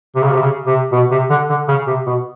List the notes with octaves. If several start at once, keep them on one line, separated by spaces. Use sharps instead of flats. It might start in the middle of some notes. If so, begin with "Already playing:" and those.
C3
C#3
C3
C#3
C3
B2
C3
D3
D3
C#3
C3
B2